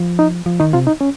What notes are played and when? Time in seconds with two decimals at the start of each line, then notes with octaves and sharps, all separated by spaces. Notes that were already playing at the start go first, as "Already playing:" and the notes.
Already playing: F3
0.19 D#4
0.46 F3
0.60 D#3 D#4
0.73 C3 F4
0.87 D#4
1.01 C#4